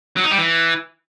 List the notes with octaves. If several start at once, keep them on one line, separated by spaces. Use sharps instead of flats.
F#3
D#4
G3
E3